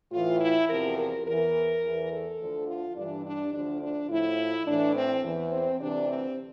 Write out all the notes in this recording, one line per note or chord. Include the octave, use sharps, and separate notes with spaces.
A2 E3 F4
E4
E2 C3 F3 A#4
A#4
E2 E3 A#4
E2 E3
A4
D2 D3 F3
F4
G2 E3 D4
D4
D2 D3 F3 D4
D4
A2 F3 E4
A2 E3 D4
C4
E2 E3
C4
D2 C3 E3 D4
C4